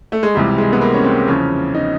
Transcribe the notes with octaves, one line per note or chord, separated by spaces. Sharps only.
A3
G#3
C#2 C3 E3 G3
G#3
B3
A#3
C#4
C4
E2 C#3 F3 C#4
D#4